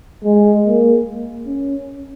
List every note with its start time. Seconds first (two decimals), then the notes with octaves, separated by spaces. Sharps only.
0.24 G#3
0.65 A#3
1.46 C#4